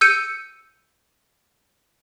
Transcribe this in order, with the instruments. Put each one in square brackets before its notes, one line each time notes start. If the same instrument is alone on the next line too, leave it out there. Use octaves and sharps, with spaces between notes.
[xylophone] E6 G6 C#7 D#7